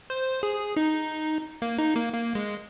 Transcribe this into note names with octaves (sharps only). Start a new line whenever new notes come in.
C5
G#4
D#4
A#3
D#4
A#3
A#3
G#3